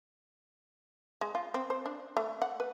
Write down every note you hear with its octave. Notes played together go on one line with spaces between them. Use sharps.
G#3
F4
C4
C5
D4
A3
F#5
B4